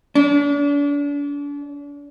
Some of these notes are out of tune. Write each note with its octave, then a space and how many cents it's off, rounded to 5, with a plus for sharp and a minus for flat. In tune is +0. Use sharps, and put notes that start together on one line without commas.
D4 -40